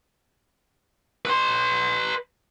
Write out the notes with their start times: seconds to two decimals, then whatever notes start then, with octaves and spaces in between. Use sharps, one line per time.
1.25 B4 C6